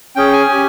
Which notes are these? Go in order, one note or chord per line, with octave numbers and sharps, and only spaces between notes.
C#4 G#4 G5
G#5
C#4 G4